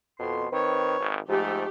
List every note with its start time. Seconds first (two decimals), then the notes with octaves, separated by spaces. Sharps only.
0.19 F2 B2 C6
0.52 D#3 C4 B4 C#5
1.00 G#1
1.29 G#2 F3 A3 G4